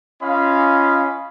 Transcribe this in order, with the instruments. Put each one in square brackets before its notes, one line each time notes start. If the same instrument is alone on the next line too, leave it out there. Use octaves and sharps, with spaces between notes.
[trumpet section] C#4 F4 D#5 F5 B5